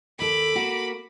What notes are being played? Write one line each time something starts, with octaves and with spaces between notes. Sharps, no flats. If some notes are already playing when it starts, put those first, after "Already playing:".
D#2 A4 B5 D6
A#3 F#4